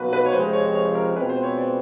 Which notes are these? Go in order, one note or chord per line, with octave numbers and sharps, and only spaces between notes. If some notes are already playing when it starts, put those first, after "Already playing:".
Already playing: B2 F#3 A#3 D#4 F#4 B4
B4
C#5
F2 C3 F3 G#3 C5
C#5
C#5
A#4
B2 G#3 C4 F4 B4
C5
C#5
D5